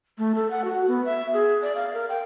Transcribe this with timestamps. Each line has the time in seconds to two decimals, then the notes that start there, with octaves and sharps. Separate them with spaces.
0.18 A3
0.35 A4
0.51 F#5
0.64 F#4
0.88 B3
1.05 E5
1.34 G#4
1.62 D5
1.75 F5
1.94 A#4
2.09 G5